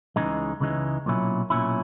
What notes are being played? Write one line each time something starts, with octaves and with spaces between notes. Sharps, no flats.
C#2 C#3 E3 G#3 D#4
C#2 C#3 E3 G#3 D#4
B1 A#2 F#3 C#4 E4
B1 A#2 F#3 C#4 E4